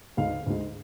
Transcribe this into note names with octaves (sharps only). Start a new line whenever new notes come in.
D2 D3 G#3 D#4 F5
D2 D3 G#3 D#4